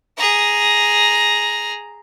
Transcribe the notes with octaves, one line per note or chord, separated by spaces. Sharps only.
G#4 A#5